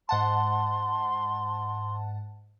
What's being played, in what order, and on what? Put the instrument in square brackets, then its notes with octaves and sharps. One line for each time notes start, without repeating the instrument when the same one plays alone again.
[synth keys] G#2 F#5 A5 [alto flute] C6